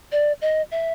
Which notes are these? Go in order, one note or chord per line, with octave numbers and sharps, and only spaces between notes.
D5
D#5
E5